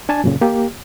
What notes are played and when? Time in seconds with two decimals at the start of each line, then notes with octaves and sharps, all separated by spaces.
0.09 D4 G#5 A5
0.24 F#2 A#2 C#3
0.41 A#3 G4